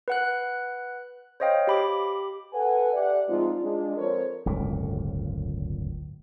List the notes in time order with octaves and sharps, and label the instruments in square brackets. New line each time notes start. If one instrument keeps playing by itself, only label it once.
[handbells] B4 F#5 F#6
C5 C#5 D#5 F5 G5
G4 B5 D6
[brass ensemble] A4 B4 F#5 G#5
G4 D5 E5 F#5
G#2 F3 G#3 C4 D#4 F4
G#3 D4 F4
F3 C4 A4 A#4 C5 C#5
[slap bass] D1 G1 C#2 A#2